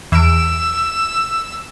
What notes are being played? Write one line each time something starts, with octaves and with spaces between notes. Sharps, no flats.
E2 E6 D7